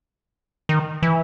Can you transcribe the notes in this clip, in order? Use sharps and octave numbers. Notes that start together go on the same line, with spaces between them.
D#3
E3